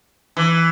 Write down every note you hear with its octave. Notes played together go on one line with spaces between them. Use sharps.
E3